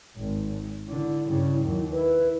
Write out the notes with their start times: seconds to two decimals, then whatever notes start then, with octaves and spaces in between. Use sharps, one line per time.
0.17 G#1
0.88 D3 E4
1.27 G2 C#3
1.63 D#2 F#3
1.92 E4 B4